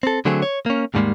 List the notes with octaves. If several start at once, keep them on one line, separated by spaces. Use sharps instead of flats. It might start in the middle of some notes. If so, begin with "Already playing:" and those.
C4 A4
D3 F#3 A3 C4 G#4
C#5
A#3 C#4
D#2 G#2 D#3 G3 G#3 A#3